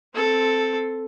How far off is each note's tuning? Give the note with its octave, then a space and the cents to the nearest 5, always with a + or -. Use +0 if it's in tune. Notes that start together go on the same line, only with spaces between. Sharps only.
C4 +0 A4 +0